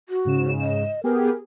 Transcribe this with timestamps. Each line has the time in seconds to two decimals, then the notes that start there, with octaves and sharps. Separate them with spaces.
0.09 F#4
0.25 G#2 C#3 E7
0.61 D#5
1.04 B3 G4 G#4 A#4